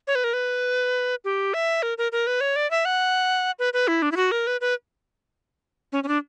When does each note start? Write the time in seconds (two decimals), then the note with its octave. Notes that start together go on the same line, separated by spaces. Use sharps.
0.07 C#5
0.15 B4
0.24 A#4
0.33 B4
1.25 G4
1.54 E5
1.83 A#4
1.98 A#4
2.12 A#4
2.27 B4
2.41 C#5
2.56 D5
2.71 E5
2.85 F#5
3.59 B4
3.73 B4
3.88 E4
4.02 D4
4.12 E4
4.17 F#4
4.32 A#4
4.47 B4
4.61 B4
5.92 C#4
6.04 C#4
6.08 D4